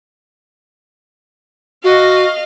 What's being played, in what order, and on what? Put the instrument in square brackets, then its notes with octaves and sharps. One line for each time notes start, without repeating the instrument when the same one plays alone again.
[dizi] F#4 [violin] D#5 F5